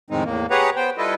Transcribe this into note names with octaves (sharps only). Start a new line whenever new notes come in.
F2 A2 D#3 G#3 C4 D#4
E2 A2 A#3
G4 G#4 B4 C#5 F#5 A#5
B3 C5 G5
G3 E4 F4 A4 B4 D#5